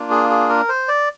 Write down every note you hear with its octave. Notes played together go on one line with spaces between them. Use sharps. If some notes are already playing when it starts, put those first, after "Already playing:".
Already playing: A#3 D4 F4
G#4
G#4
A#4
C5
D5